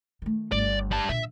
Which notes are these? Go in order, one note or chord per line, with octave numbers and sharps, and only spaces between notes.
D#3 A3
G1 A3 D5
G3 A5
A#2 D3 E5